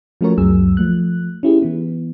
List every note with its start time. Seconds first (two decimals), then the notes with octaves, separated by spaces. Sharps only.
0.21 F3 A3 C#4 F#4 A#4 C#5
0.38 C#2 F#2 F#3 G#4 E6
0.77 F3 A3 F#6
1.43 C#4 E4 G4 G#4
1.62 E3 B3